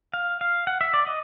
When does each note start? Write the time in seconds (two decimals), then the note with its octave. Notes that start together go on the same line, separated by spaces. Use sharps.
0.14 F5
0.41 F5
0.67 F#5
0.81 E5
0.94 D5
1.07 D#5